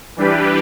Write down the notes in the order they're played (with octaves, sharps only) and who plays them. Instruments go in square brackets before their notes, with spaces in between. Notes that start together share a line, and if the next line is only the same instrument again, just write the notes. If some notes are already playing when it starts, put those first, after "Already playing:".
[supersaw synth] E3 G3 D4 G4 B4